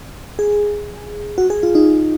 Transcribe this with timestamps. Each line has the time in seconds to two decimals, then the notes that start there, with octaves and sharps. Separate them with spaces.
0.39 G#4
1.38 F#4
1.50 G#4
1.63 F4
1.75 D#4